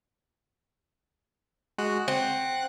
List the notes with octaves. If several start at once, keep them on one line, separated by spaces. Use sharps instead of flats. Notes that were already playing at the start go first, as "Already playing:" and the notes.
G#3 F#4 F#6
C4 F#5 F#6